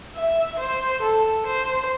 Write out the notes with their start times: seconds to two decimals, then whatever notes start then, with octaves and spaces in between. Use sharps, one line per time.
0.15 E5
0.59 C5
1.02 A4
1.47 C5